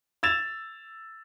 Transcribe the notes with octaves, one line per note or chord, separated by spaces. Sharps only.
E6 G#6 A6 E7 F7